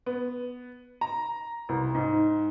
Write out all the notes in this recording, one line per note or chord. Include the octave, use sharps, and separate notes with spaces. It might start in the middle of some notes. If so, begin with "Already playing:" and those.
B3
A#5
C2
G#2